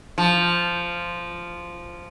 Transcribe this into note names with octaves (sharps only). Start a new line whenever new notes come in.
F3